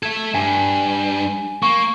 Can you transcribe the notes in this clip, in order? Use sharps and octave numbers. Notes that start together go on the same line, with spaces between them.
A4 E5 G#6
G2 G#5
A#3 C#6